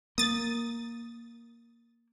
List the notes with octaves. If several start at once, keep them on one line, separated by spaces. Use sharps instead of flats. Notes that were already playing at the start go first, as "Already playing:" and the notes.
A#3 D#6 A6